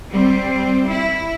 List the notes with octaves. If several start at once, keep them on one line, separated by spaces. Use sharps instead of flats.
G3 C4
E4